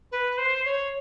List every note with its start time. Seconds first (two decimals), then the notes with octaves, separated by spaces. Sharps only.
0.12 B4
0.38 C5
0.65 C#5